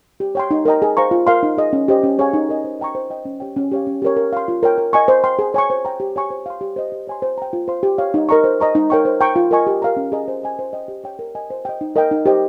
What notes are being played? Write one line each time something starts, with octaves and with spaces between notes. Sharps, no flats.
G4
C#5 G5 C6
D#4
A#4 D#5 G5 A#5
G#4
C5 F5 A#5 C#6
F4
A#4 F5 C6
D#4
G#4 D#5
C#4
G4 C5 D#5
C#4
G#4 C#5 F5 G#5
D#4
A#4 D#5 G#5
C5
D#5 G5 A#5 C#6
C5
D#5 G5
C#4
G4 C#5 G5
C#4
G4 C#5 F5
C#4
G4 A#4 C#5
A#4
F5 C6
F4
A#4 C#5 G5
A#4
D#5 G#5 C#6
C5
G5 C6
G#4
C#5 G#5 C#6
C5
G5 A#5
G4
C#5 G#5 C#6
C5
F5 C6
G4
C5 D#5
G4
C#5 G#5 C6
C5
G5 A#5
F4
C5 F5 C6
G4
C#5 F5
D#4
A#4 D#5 A#5 C#6
C5
D#5 A#5 C#6
D#4
A#4 C#5 G5 C#6
C5
G5 A#5 C#6
F4
A#4 D#5 G#5 C#6
G4
A#4 F5 A#5
C#4
G#4 D#5 A#5
C5
D#5 G#5
C5
D#5 G5
G4
C#5 G5
A#4
D#5 G#5
C5
D#5 G5
D#4
A#4 D#5 G5
D#4
G4 C5 D#5 G5